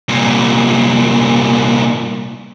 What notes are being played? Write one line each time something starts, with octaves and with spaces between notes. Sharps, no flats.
C2 A#2